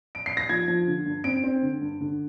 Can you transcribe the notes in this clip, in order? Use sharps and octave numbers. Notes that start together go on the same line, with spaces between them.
D7
C7
A#6
F3 G#6
F3
D3
G2
C4 D7
C4
D3
G2
D3